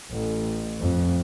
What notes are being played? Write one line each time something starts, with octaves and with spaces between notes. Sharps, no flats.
A1
F2